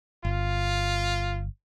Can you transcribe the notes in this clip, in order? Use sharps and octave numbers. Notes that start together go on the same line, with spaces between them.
G1 F4